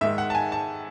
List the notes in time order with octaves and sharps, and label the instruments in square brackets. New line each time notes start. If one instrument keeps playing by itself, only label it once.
[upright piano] G#2 D#3 G#3 E5
F#5
A5
G#5
A5